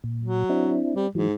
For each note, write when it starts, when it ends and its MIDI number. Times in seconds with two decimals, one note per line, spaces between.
0.04 0.44 46
0.22 0.79 54
0.50 0.95 60
0.50 0.95 62
0.50 0.95 64
0.96 1.08 55
0.96 1.07 60
1.15 1.34 44
1.15 1.29 52
1.15 1.29 54